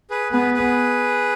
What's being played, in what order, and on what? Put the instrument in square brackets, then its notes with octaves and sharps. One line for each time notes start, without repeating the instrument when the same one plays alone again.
[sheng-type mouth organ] G#4 B4
[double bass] B3 [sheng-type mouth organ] G#4 B4
[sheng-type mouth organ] G#4 B4